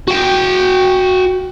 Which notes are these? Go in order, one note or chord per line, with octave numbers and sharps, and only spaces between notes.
F#4 G5